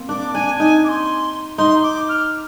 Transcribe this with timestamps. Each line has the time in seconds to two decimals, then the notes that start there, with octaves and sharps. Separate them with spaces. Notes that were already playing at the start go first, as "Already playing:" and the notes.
Already playing: A#3 C4
0.09 D4 D6
0.34 D4 G#5
0.60 D#4 G#5
0.84 D6
0.89 C6
1.58 D#4 C6
1.83 D6
2.09 F6